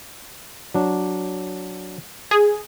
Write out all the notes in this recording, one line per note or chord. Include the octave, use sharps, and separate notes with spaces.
F#3 D4
G#4